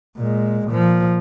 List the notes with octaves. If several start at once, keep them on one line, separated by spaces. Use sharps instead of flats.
A#2 G#3
A#2 F3